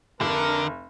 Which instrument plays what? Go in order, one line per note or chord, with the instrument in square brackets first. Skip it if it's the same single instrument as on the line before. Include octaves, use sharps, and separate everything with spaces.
[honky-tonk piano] F1 [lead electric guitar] D3 [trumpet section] A#4